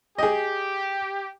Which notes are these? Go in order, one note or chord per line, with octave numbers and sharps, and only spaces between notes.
G4 G#4 D#5